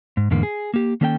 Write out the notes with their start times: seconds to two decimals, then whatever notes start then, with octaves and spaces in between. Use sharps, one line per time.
0.17 G#2
0.31 E2 G#2 D3 A#3
0.43 G#4
0.74 A#3 G4
1.01 D#3 A#3 C#4 A4 E5 G5